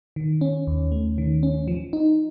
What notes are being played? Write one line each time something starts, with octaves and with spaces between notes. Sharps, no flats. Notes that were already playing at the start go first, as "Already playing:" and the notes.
D#3
C#4
D#2
A3
D#3
C#4
F3
D#4